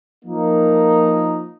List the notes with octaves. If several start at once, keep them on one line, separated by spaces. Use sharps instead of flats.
F3 A#3 D#4